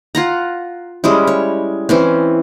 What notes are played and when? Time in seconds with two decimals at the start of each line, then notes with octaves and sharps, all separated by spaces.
0.15 F4 F#5 A#5
1.04 G3 G#3 C#4 E4
1.27 C#5
1.89 E3 C4 C#4